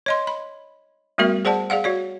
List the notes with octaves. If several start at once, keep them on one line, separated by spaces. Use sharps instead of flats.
C#5 D#5 C6
B5
G3 A3 B3 F#4 A#4 E5
G#4 C5 D5 F#5 A5
G#4 D5 F5 F#5
F#4 C#5 D5